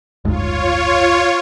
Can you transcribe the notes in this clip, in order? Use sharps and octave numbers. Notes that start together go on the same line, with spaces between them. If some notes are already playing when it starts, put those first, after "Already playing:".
F#1 D2 G#2 F4 C#5